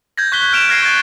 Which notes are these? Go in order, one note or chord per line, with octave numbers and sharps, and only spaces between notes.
G6 G#6 A#6
C#6 F#6 B6 G7
F6 D7 E7 F7
F6 G#6 A#6 C7 D7 D#7
C#6 F#6 G#6 A6 C7